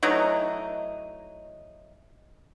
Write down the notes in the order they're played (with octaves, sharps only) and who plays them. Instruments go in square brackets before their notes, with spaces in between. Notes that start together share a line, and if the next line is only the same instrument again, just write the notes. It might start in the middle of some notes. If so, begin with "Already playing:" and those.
[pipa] E3 F#3 A3 D#4